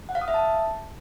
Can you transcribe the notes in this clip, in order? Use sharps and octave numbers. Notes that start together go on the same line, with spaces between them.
F#5
F5
D#6
E5
A5